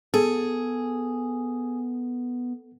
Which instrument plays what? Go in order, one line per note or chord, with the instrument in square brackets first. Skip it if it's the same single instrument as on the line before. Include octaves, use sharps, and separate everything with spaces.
[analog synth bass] B3 [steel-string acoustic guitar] G#4 [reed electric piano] A4